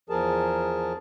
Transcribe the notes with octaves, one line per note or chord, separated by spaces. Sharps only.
E2 F3 G#4 A#4 A5